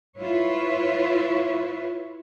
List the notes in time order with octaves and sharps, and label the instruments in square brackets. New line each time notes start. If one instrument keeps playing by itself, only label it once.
[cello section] E4 F4 B4 C#5